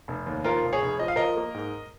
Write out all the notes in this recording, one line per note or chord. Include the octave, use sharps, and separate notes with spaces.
F1
D#2
F3 F4 A#4
F1
G#4 C#5
F1
F3 D#5
F5
F3 A#4 D#5
A#3
G#2